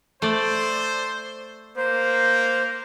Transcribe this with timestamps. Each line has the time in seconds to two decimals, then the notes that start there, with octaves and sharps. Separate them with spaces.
0.22 A3 C5 D5
1.77 A#3 C5